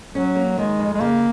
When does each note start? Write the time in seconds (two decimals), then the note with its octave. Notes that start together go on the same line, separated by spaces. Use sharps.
0.14 F#3 C#4
0.35 A#3
0.58 D#3 G#3
0.79 F2
0.94 G#3
1.00 C#3 A#3